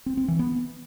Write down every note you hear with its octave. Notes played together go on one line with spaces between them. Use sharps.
C4
C4
E3
B3